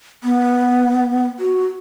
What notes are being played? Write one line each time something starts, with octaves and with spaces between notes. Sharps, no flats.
B3
F#4